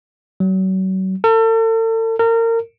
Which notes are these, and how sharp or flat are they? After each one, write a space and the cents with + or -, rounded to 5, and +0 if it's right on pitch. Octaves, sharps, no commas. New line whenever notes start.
F#3 +35
A4 +40
A#4 -30